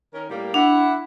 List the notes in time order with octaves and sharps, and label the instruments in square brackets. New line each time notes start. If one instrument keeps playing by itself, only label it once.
[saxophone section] D#3 C#4 A#4
A2 G3 A#3
[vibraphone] D4 [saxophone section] E4 F#5